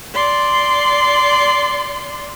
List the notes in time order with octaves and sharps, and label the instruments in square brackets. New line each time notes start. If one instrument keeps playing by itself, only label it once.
[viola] D5 C6